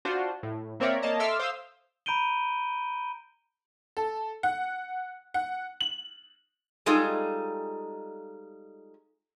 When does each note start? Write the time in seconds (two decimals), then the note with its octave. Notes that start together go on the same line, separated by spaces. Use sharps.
0.05 D4 F4 F#4 C5
0.43 A2
0.80 A#3 C4 A#4 C#5 D5 E5
1.02 A#3 C#5 D#5 A5 A#5
1.19 A4 E5 C6 D6 E6 F6
1.39 C5 F5 C6 D#6 E6
2.06 A#5 B5 G6 D7 D#7 G7
3.97 A4
4.43 F#5
5.34 F#5
5.81 F#7
6.86 G3 G#3 D#4 F4 G#4 A4